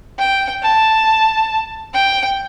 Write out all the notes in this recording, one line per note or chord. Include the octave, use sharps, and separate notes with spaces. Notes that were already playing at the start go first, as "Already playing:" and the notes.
G5
A5
G5